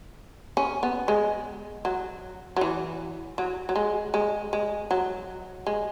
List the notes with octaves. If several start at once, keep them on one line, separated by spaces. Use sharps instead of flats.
C#4
B3
G#3
F#3
F#3
E3
F#3
F#3
G#3
G#3
G#3
F#3
G#3